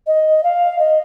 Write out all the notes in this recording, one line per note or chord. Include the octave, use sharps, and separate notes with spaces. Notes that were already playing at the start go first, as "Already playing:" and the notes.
D#5
F5
D#5